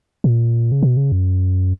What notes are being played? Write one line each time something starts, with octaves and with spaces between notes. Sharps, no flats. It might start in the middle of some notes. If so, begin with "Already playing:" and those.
A#2
C#3
B2
C#3
F#2